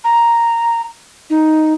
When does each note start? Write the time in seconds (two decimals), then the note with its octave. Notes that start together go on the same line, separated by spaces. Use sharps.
0.04 A#5
1.30 D#4